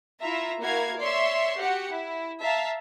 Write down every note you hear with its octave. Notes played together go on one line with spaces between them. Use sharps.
E4 F4 E5 A#5
A#3 E4 F#4 A#4 F5 G#6
C#5 D5 E5 C6 C#6
F#4 G4 F#5 C#7
E4
E5 F5 A5 A#5